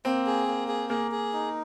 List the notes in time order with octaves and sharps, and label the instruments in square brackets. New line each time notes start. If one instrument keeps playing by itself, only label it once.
[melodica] A#3 [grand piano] C4
[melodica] G#4
A#3
G#4
[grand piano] A#3 [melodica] G#4
[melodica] G#4
D#4